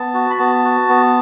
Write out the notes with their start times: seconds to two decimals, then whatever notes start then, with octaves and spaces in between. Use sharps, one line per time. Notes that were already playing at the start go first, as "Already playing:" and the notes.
Already playing: B3 A5
0.14 F#4
0.30 B5
0.39 B3 A5
0.64 F#4
0.89 B3